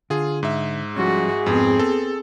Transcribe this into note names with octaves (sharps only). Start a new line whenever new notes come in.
D3 F4 G#4
G#2 E5
F3 G3 C#4 F#4 G#4
F2 G#2 B3 C4
B3 A4